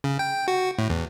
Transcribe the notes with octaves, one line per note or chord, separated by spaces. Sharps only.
C#3
G5
F#4
A2
E2